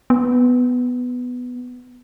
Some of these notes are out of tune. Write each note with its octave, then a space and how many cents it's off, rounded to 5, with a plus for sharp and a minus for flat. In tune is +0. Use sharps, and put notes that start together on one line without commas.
B3 +5